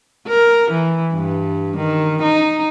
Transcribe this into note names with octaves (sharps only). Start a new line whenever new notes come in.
A#4
E3
G2
D#3
D#4